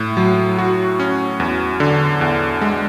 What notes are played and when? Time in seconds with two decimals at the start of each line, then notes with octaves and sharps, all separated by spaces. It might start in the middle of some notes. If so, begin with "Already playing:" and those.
Already playing: A2
0.17 F#3
0.59 F#4
1.00 C#4
1.40 E2
1.80 D3
2.21 E2
2.61 G#3